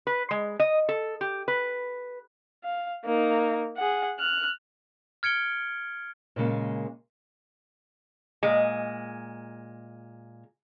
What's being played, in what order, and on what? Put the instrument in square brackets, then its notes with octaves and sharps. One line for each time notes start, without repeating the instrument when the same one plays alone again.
[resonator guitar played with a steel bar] B4
G#3
D#5
A4
G4
B4
[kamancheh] F5
A#3 D#4
G#4 F#5
F6 F#6
[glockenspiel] F6 G#6 C#7 D7 G7
[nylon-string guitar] A#2 C#3 G#3 A#3
[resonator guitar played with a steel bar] A#2 G#3